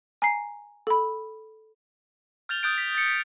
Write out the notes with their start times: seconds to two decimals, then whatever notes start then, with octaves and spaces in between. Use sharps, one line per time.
0.22 G#5 A#5 C7
0.87 A4 B5
2.49 F6 G6 A6 F7 G7
2.63 D#6 F#6 G6 A6 D7
2.78 B6
2.95 A6 C#7
3.08 B6